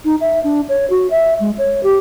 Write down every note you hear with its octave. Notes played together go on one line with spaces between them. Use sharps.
D#4
E5
D4
C#5
F#4
E5
G#3
C#5
G4